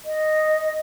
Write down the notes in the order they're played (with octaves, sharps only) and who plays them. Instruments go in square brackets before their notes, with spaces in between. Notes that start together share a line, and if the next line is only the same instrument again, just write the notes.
[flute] D#5